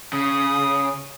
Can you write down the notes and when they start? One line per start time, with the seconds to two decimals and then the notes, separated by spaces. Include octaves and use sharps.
0.13 C#3 D#6